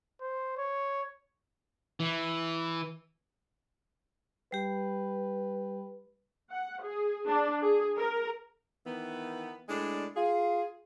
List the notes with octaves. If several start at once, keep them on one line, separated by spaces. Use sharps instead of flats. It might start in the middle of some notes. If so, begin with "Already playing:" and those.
C5
C#5
E3
G3 G4 B4
F#5
G#4
D4
G#4
A#4
D#3 E3 B3
A2 G#3 D4
F4 G#4